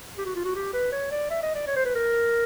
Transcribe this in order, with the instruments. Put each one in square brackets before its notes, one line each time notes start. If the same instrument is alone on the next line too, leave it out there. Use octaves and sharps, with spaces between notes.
[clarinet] G4
F#4
F4
F#4
G4
B4
C#5
D5
E5
D#5
D5
C#5
C5
B4
A#4